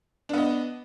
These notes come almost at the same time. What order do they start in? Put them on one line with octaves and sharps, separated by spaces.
D4 B3 D#5